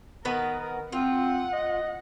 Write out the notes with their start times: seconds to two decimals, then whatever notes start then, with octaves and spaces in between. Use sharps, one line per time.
0.25 D#3 B3 A#4 B4
0.92 C4 F4 F#5
1.53 D#5